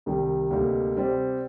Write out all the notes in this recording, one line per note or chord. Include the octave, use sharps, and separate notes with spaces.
C2 C3 D#3 G3
D2 C3 G3 A#3 D#4
C3 G3 C4